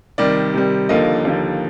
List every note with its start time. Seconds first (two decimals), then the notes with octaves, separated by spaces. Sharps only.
0.18 C3 D#3 G3 D5
0.54 C3 D#3 G3
0.89 D#2 D3 F3 A#3 D#5
1.25 D#2 D3 F3 A#3